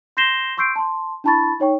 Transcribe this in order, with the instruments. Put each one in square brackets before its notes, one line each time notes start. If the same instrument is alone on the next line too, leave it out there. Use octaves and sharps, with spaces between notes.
[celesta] C6 G6 A#6 C7 E7 G7
C6 C#6 E6 G6 C7 D7
A5 C6
D4 E4 A5 B5 C#6 A6
D#4 C#5 G5 C#6